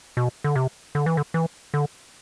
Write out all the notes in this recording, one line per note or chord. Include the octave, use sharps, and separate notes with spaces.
B2
D3
C3
D3
E3
D3
E3
D3